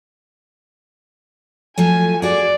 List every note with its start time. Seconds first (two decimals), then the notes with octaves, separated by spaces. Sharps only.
1.78 F3 F#3 A3 G#5
2.22 F#4 G#4 D5